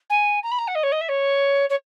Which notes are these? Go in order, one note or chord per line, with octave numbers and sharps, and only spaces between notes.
G#5
A#5
B5
A#5
F#5
D#5
C#5
D#5
E5
C#5
C#5